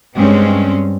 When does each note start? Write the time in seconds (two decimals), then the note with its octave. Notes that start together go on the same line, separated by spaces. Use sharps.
0.16 G2 G#3 C4 C#4